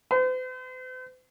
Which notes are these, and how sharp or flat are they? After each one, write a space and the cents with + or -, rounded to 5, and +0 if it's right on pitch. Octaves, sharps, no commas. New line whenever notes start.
C5 -45